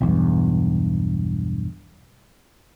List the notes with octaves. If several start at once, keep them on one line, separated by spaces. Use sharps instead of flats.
B1 E2 G2